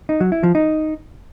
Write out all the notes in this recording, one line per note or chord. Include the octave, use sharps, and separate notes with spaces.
D#4
F#3
E4
F3
D#4